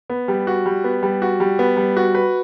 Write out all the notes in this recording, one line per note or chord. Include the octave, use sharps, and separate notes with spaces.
B3
G3
F#4
G3
B3
G3
F#4
G3
B3
G3
F#4
B4